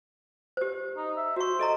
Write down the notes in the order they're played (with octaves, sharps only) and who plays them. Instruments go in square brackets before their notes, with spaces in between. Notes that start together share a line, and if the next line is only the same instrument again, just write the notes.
[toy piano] G4 C5
[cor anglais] D#4
E5
[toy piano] F#4 C#6 [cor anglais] C5
[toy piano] A4 D#5 A#5